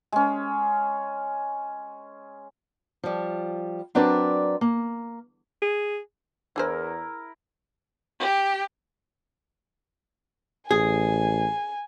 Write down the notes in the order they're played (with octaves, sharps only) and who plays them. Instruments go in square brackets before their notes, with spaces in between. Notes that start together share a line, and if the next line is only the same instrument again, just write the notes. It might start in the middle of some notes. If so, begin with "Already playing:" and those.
[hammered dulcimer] G#3 C#4
[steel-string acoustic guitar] F3 G3
F#3 C4 D4 A#4 B4 D5
A#3
[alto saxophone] G#4
[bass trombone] E2 [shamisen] D4 G#4 C5 [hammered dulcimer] E4 A#4
[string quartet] G4
[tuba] A1 [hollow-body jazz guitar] G#4 [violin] G#5